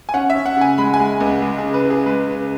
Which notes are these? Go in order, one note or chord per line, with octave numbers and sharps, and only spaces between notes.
G#5
C#4 F#5
E5
C#4
F#5
C#3 G#5
G#3 B5
G#5
G#3
C#2
G#3
G#4
C#3
B4
E4
G#4
G#3 B4
C#3